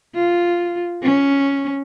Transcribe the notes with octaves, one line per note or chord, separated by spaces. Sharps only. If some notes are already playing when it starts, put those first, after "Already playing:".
F4
C#4